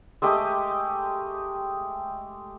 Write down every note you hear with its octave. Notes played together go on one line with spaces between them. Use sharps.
G#3 A3 G4 D#5